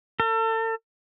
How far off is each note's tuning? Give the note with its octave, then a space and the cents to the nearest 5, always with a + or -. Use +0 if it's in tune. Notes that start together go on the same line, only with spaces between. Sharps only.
A4 +40